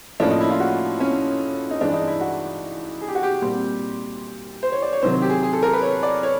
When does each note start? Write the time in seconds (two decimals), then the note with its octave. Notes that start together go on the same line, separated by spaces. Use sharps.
0.20 A2 F3 A#3 C#4 D4
0.30 D#4
0.41 E4
0.50 F4
0.60 F#4
1.00 C#4
1.71 D#4
1.81 G2 E3 G#3 D4
1.94 D#4
2.08 E4
2.21 F#4
3.01 G#4
3.08 G4
3.15 F#4
3.23 G4
3.42 A#2 G3 C4
4.63 C5
4.72 C#5
4.82 D5
4.93 C#5
5.02 C3 D#3 F#3 C5
5.22 G4
5.30 G#4
5.43 G#4
5.53 A4
5.63 A#4
5.73 B4
5.82 C#5
6.03 D5
6.23 C#5